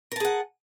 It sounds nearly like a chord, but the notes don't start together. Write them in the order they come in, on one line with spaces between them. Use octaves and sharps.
A#4 A5 G#4 F#5